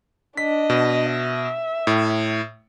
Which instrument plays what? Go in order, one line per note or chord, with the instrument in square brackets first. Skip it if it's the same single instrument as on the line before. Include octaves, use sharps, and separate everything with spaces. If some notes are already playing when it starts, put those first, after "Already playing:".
[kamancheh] D4 D#5 [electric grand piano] B6
[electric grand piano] B2
[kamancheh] E5
[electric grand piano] A2